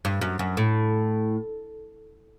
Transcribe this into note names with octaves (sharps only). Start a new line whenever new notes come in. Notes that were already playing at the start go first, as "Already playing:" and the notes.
G2
F#2
F#2
A2